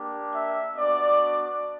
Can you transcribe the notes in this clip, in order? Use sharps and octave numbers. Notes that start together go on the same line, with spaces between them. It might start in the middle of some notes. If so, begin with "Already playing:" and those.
Already playing: A#3 D4 G4
E5
B3 D4 F#4 D5